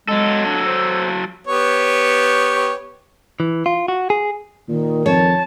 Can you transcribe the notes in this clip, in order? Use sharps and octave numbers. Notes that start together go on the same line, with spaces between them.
F#3 G#3 A4
D4
C5
B3 G4 C#5
E3
F4
F#4
G#4
A#2 D#3
F2 C#5 A5